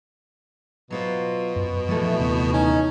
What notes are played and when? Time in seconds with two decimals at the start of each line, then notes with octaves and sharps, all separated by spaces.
0.90 B2 F#3 F4 C5
1.56 F#2
1.89 A#2 E3 F3 A3
2.19 D#2 C3 B3
2.53 C#4 D#4